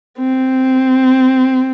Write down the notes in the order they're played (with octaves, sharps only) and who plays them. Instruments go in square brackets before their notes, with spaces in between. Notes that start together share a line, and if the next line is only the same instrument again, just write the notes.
[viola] C4